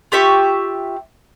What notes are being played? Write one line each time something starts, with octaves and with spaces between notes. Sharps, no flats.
F4 G4 E5 C#6